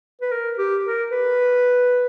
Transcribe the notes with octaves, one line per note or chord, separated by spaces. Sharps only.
B4
A#4
G4
A#4
B4